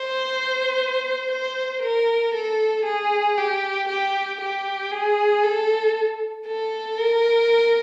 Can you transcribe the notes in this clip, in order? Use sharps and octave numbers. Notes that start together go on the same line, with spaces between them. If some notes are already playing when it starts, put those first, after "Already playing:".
Already playing: C5
C5
A#4
A4
G#4
G4
G4
G4
G#4
A4
A4
A#4